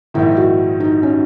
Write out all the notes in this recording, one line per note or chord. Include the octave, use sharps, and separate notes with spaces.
A#1 G#2 D#3 E4
F#4
D#4
C#4